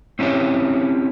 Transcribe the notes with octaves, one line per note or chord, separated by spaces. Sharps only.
C4 C#4 E4 G4 C#5